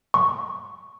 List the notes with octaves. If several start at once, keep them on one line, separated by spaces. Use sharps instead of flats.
C#6